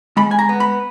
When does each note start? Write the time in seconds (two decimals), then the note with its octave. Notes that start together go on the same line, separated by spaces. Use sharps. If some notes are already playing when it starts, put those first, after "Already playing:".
0.17 G#3 B5
0.31 G#5
0.39 A#5
0.49 B3
0.60 B5